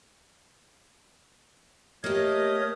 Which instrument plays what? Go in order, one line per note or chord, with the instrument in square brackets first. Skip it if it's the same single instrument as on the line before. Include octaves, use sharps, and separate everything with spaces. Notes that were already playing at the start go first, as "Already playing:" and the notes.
[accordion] A3 D#5 D#6 [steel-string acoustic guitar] A#3 G4 [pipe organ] A#4 C#5